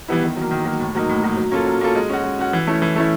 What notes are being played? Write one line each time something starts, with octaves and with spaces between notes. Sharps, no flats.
E3 G3 B3 E4
D#3
F#3 A#3
D#3
F#3 A#3
A2
F#3 A#3 D#4
A2
F#3 A#3 D#4
F#3
A#3 C#4 F4 A4
F#3
A#3 C#4 F4 A4
G#3
C#4 F#4
G#3
C#4 F#4
E3
A3 C#4 E4
E3
A3 C#4 E4